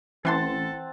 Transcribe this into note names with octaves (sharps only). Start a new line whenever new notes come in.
A1 E3 C4 A4 F#5 A5 C6